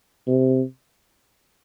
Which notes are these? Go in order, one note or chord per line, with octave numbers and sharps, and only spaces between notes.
C3